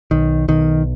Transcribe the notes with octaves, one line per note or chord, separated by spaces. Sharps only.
B1 D#3
B1 D#3